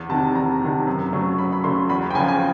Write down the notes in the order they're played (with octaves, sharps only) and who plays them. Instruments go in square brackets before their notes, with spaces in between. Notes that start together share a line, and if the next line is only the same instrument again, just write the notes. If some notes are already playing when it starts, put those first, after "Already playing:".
Already playing: [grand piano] E2
C3 D#3 A5
E2 A#5
C3 D#3
F#2
C#3 F#3 A3
F#2 B5
B5
C#3 F#3 A3 C6
E2 B5
A#5
G5
C#3 G#5
F3
G#5